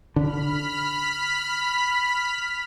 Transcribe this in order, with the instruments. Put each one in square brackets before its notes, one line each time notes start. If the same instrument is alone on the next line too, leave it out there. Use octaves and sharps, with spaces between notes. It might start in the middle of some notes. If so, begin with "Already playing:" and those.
[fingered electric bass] D3 [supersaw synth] B5 F6 B6